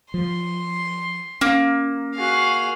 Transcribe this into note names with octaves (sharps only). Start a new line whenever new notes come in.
F3 C6
A#3 C#4
F#4 G#4 F5